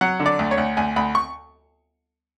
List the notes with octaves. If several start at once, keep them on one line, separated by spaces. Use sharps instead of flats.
F#3 F#5
D3
D5
D2
C#5
D2
D2 G#5
D2 B5
C#6